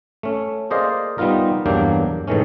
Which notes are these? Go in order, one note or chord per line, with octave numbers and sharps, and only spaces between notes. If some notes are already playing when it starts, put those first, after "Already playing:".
A3 C#4
A#3 G#4 C5 D5 D#5 F5
G3 B3 D#4 F4 A#4
E2 G2 F#3 A#3 D4 G5
G#2 C3 D#3 E3 A3 C#4